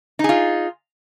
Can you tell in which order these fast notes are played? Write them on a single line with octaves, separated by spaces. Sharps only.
D#4 G#4 F4